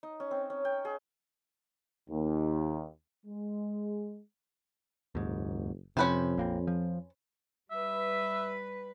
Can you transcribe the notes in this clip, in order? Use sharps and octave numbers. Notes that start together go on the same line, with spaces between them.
D#4
C#4
C4
C#4
G5
G#4
D#2
G#3
F#1 D#2 G#2
F2 C3 C#4 B4 C5
A#1 A#3 C4
F3
G3 B4 E5